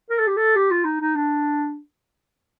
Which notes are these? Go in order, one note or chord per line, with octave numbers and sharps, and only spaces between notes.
A#4
A4
G4
A4
G4
F4
D#4
D#4
D4